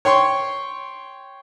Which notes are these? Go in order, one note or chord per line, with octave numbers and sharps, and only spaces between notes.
C#5 G5 C6 C#6